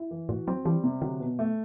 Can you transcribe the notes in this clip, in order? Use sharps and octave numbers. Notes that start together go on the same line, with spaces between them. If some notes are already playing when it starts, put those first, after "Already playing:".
Already playing: E4
E3
A2 F#4
F#3 C4
E3 G3
C3
D3 F#3
B2
A3